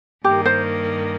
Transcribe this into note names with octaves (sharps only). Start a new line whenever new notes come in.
G2 D#3 A#3 G4
C5